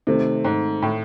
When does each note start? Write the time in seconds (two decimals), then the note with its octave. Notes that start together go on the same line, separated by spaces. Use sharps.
0.07 C3 D#3 A3 C4
0.45 G#2
0.82 A2